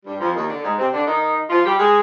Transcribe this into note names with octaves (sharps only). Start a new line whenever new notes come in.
G2 G3
F2 F3
D#2 D#3
D3
G#2 G#3
C3 C4
D3 D4
D#3 D#4
F3 F4
G3 G4
G#3 G#4